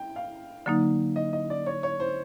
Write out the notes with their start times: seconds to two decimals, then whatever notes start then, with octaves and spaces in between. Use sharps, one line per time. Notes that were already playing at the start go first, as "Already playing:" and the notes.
Already playing: G5
0.16 F5
0.66 D3 F#3 A#3 D#4
1.16 D#5
1.33 D#5
1.50 D5
1.66 C#5
1.83 C#5
2.00 C5